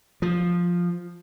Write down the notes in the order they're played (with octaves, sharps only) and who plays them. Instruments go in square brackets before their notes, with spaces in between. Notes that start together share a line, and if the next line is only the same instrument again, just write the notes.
[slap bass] F3